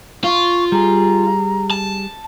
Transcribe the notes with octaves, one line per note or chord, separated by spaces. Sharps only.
F4 C#6
G3 G#4 A#5
A5